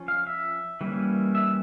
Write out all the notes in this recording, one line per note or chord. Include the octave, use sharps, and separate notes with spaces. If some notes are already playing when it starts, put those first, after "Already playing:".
Already playing: F3 C#4
F5
E5
E3 G3 A#3 C#4
E5